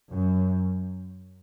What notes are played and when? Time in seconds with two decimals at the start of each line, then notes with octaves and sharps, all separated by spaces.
0.13 F#2